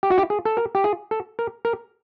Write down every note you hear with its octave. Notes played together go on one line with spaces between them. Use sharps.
G4
F#4
G4
G#4
A4
A#4
G4
G#4
A4
A#4
A#4